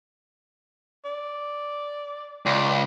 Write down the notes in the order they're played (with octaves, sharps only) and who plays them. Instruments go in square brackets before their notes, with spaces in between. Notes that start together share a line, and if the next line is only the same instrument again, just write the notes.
[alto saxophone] D5
[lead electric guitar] C#2 [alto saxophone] D5